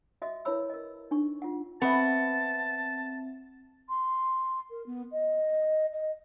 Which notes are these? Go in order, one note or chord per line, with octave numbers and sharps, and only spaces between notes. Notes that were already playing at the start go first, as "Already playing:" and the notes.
F#4 D#5 E5 D#6
E4 A#4 B4 C#5 B5 E6
A#4 D#5
D4 D#4 C#6
F4 F#5
B3 C4 E5 A5
C6
A#4
B3
D#5
D#5